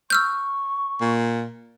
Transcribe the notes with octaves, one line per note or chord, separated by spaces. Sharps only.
C#6 E6 F6 G6
A#2